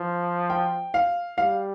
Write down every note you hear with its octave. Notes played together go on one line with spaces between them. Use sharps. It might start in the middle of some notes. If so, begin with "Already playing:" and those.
Already playing: F3
G5
F5
G3 F5